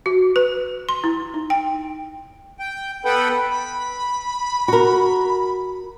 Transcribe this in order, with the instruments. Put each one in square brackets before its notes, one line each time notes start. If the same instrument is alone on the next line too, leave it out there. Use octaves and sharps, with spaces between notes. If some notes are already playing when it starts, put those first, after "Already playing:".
[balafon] F#4
B4
C6
E4
D#4
G5
[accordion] G5
B3 A4 B4 F#5 G5 B5
[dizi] B5
[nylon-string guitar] F#4 A#4